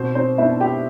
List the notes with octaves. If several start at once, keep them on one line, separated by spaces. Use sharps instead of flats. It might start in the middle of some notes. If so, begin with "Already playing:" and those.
Already playing: B2 C4 C5
C4 C5
B3 D4 E4 E5
G4 G5